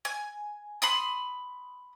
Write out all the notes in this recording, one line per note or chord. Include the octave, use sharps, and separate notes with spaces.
G#5
B5 C6 D#6